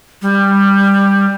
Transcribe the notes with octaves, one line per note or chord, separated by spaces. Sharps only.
G3